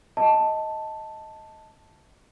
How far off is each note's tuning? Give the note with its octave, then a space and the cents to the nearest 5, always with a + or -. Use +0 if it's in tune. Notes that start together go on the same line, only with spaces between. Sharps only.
D#5 +15 A5 +0